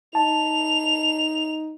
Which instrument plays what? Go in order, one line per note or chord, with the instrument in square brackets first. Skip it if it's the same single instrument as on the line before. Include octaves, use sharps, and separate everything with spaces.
[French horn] D#4 [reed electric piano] A5 [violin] F7